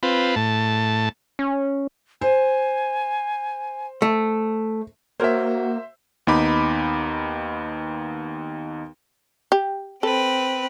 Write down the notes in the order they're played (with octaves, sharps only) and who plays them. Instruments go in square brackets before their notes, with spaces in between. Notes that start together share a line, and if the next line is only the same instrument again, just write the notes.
[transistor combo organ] C4 F4 B4
A2 A5
[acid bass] C#4
[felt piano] C5 [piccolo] G#5
[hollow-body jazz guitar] A3
[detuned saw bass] A#3 [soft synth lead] F#4 [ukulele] A#4 C#5 [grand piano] C5 E5
[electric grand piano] D#2 B3 D#4 B5 D6
[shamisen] G4
[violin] C4 B4 [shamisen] A4